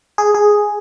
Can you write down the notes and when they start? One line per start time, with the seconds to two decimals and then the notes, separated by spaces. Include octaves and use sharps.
0.18 G#4
0.34 G#4